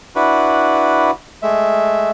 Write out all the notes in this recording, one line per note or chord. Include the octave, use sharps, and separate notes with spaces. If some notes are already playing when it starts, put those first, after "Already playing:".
D4 E4 F#4 B4
G#3 A3 E5